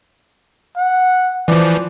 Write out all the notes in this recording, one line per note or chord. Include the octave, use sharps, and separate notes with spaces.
F#5
E3 F3 D5